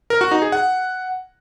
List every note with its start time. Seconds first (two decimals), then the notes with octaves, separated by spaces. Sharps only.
0.10 A#4
0.21 F#4
0.31 D#4
0.42 G#4
0.52 F#5